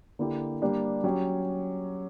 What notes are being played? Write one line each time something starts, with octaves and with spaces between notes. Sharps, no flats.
D3 A#3 E4 G4
G3 A#3 D4 G4
F#3 C#4 G4